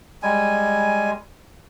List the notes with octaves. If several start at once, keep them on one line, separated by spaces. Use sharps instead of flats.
G3 G#3 G#5